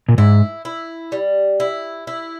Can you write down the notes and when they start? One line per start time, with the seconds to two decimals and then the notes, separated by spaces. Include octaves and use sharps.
0.09 A#2
0.18 G#2 E4
0.65 E4
1.12 G3
1.60 E4
2.07 E4